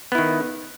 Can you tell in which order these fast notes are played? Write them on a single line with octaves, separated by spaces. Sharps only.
B3 E4 D#3